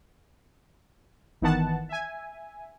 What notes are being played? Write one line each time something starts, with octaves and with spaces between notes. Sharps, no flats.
G1 D#3 E3 B3 F#5 A5
E5 G#5